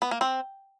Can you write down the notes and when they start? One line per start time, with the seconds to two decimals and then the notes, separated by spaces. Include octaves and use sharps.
0.02 B3
0.11 A#3
0.21 C4